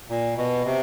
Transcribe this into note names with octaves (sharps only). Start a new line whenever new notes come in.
A#2
B2
C3